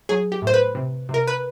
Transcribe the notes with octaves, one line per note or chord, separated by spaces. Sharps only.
F#3 G#4
G4
A2 C5
B4
C3
C3
A#4
B4